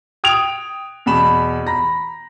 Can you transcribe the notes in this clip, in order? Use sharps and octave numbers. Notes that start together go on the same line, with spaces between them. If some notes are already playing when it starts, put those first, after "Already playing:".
G5 D#6 G#6 D7 F7
E2 B2 B5 E7
A#5 B5 A#6